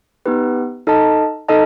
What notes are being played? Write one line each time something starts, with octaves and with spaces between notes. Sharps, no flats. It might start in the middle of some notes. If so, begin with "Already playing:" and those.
B3 D#4 G4 B4
D#4 A4 D#5 A5
D#4 A4 D#5 A5